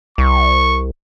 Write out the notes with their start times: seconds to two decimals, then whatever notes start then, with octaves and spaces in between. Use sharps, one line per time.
0.18 C2 C#6